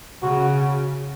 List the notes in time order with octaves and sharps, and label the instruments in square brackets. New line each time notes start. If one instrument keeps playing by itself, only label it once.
[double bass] C#3 [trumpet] F#4